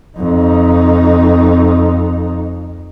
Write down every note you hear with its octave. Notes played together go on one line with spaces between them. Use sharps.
F2 D#4